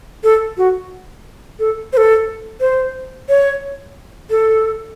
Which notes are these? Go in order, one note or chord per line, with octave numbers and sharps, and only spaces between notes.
A4
F#4
A4
C5
A4
C5
C#5
A4